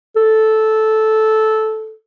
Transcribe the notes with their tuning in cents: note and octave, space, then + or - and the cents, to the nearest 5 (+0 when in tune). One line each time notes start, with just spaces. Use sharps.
A4 -10